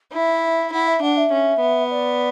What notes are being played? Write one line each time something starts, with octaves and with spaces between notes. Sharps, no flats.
E4 E5
E4 F#5
E5
D4 F#5
E5
C#4
B3
D5